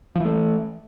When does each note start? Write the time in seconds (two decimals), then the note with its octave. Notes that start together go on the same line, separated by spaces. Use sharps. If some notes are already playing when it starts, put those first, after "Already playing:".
0.15 F3
0.20 E3
0.25 A3